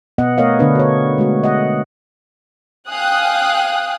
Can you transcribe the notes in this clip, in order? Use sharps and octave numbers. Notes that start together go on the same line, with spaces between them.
B2 B3 D#5 F#5
A3 B3 A#4 C#5 D#5 F5
D3 B3 D4 B4
F#4 C#5
G#3 A3 F#4
D#5 F#5
F5 G5 G#5 D#6 F#6